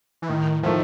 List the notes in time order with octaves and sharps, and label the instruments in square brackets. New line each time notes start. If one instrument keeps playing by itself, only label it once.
[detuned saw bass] E3
[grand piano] A2 [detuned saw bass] D#3
[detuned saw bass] D#3 [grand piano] F3 A3